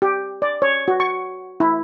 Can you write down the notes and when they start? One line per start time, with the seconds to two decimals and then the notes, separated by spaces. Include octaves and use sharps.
0.02 G4
0.42 D5
0.62 C#5
0.88 F#4
1.00 C#6
1.60 E4